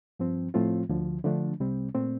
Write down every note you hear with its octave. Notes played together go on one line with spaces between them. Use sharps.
G2 F3 C4
A2 F3 A3 C4 F4
D2 D3 F3
D3 F3 A3 D4
C2 C3 G3 C4
A#2 A3 C4